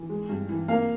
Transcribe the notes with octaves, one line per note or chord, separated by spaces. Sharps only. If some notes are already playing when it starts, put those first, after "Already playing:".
Already playing: E3
G#3
G2
E3
A#3 F5